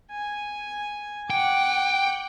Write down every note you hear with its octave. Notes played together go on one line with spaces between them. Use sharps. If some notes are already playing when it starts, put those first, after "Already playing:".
G#5
F#5 G5 D6